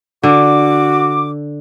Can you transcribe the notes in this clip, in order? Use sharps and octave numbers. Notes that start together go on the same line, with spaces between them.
D3 F#4 D6